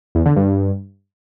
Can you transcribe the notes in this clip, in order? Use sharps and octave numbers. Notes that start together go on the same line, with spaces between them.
E2
D3
G2